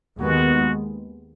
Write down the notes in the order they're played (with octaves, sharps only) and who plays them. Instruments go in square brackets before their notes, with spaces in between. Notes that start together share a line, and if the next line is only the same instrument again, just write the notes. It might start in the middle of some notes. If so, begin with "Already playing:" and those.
[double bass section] D#2 D#3 G#3 B3 [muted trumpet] F#4